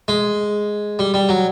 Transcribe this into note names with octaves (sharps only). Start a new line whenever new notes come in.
G#3
G3
G3
F#3